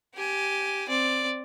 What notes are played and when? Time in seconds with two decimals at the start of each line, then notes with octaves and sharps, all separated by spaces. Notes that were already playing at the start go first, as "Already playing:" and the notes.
0.15 G4 G#5
0.89 C4 D5